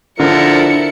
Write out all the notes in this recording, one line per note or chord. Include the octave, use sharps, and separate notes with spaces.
D3 F3 E4 A4 A#4 C#7